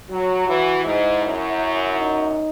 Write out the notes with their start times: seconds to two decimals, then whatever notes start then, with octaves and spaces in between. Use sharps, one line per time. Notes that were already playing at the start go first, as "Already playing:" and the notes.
0.10 F#3 F#4
0.47 E3 F#4
0.85 G#2 E4
1.24 F#2
1.99 D#4